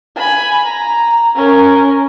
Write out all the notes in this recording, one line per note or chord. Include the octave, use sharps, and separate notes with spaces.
G#5 B5
A#5
C#4 A#4